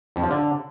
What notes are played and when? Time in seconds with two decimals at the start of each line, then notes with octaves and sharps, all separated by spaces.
0.16 F2
0.23 F3
0.30 D3